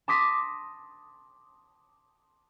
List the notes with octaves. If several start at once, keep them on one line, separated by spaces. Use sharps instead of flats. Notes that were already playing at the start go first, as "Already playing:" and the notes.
A5 C6 D6 D#6 A#6 B6